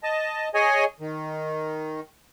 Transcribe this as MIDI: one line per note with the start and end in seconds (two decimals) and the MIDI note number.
0.03 0.49 75
0.03 0.49 81
0.54 0.85 68
0.54 0.85 73
0.54 0.85 75
0.54 0.85 80
1.00 2.00 51